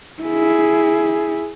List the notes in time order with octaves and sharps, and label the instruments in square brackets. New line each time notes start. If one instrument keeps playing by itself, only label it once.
[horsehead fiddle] E4 G#4